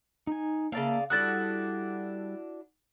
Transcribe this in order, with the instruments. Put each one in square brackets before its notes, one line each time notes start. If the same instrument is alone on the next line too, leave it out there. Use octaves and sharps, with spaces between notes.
[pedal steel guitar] D#4 G#5
[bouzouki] C#3 D5 F5 [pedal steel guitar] A#3 E5 A5
[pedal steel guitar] G3 A4 D#6 [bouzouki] D4 E4 F#4 [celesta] F#6 A6